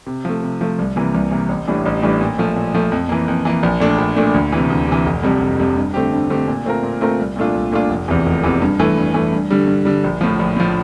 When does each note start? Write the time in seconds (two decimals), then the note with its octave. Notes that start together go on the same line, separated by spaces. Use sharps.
0.07 C3
0.25 F3 A3
0.43 C3
0.61 F3 A3
0.79 C2
0.96 C3 E3 A#3
1.14 C2
1.31 C3 E3 A#3
1.49 A1
1.67 A2 E3 G3 D4
1.86 A1
2.02 A2 E3 G3 D4
2.21 A#2
2.38 F3 A3
2.56 A#2
2.74 F3 A3
2.92 F2
3.09 E3 A#3
3.28 F2
3.45 E3 A#3
3.63 A#1
3.80 A#2 A3 D4
3.98 A#1
4.16 A#2 A3 D4
4.34 D2
4.52 C3 E3
4.70 D2
4.87 C3 E3
5.06 F1
5.23 F2 C3 G3
5.41 F1
5.58 F2 C3 G3
5.76 G2
5.94 D3 A3 C4 G4
6.12 G2
6.30 D3 A3 C4 G4
6.47 A#2
6.66 A3 C4 F4 A#4
6.83 A#2
7.01 A3 C4 F4 A#4
7.19 C2
7.36 A#2 A3 D4 F4
7.54 C2
7.72 A#2 A3 D4 F4
7.90 F1
8.08 E2 C3 E3
8.26 F1
8.43 E2 C3 E3
8.62 G2
8.79 E3 A3
8.97 G2
9.14 E3 A3
9.32 G2
9.50 D3 G3
9.67 G2
9.85 D3 G3
10.04 A#1
10.21 A2 F3
10.39 A#1
10.57 A2 F3